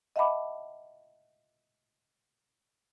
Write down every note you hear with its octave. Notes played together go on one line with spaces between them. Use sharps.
D#5 E5 F#5 A5 B5 D6